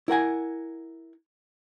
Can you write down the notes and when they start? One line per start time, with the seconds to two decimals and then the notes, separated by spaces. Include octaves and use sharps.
0.08 E4 A#4 F#5 G#5